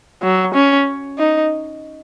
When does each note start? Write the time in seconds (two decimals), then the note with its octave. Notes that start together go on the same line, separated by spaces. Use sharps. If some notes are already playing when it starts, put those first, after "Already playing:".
0.23 F#3
0.54 C#4
1.18 D#4